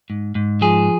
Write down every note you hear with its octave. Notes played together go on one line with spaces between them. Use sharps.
G#2
G#2
F3 G#4